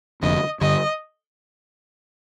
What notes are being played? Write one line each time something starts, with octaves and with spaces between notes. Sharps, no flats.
F1 F2 D3 D#5
G2 D3 G3 D#5